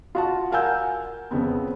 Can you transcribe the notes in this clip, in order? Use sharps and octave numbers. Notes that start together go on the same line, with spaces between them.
F4 F#4 A5
A#4 F5 F#5 G#5 E6 G6
F2 C#3 B3 C4